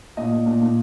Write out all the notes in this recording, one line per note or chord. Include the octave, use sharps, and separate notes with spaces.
A#2 D#5
A#2
A#2
A#2